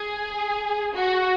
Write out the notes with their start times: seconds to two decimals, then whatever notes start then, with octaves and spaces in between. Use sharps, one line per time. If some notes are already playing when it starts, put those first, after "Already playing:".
Already playing: G#4
0.94 F#4